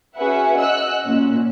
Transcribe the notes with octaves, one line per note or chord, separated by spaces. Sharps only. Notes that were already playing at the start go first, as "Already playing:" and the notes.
C#4 F#4 G#4 B4 E5 F#5
D#5 F#5 E6 F#6
A#2 C#4